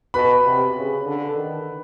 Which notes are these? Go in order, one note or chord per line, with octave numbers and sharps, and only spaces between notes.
B2 B4 B5
C3
C#3
D3
D#3